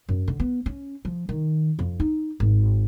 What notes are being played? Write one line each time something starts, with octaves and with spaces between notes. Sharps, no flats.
F#2
D3
B3
C#4
F3
D#3
F2
D#4
G#1